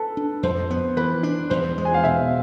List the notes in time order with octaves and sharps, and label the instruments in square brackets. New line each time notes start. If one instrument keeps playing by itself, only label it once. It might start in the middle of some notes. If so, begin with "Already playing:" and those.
Already playing: [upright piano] A4 B4
[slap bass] D4
[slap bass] F2 [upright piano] C5
[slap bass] B3
[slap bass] E3 [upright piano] B4
[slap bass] D4
[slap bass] E2 [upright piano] C5
[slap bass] G#3
[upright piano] G#5
F5
[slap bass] B2 [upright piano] E5